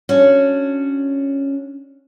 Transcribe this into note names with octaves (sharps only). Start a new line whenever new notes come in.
C#4 D4 F#4